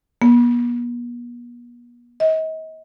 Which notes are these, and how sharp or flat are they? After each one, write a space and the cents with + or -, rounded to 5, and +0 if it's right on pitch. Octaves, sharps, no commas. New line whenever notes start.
B3 -45
D#5 +35